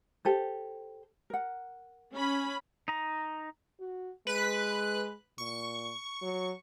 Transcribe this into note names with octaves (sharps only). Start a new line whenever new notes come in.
G4 A4 C5
A#4 F#5
C#4 B5
D#4 A#5
F#4
G#3 B4 F#6
A#2 C#6
F#3